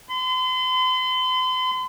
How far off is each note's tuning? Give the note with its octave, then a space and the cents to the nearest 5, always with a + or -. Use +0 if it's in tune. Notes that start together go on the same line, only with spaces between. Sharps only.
C6 -40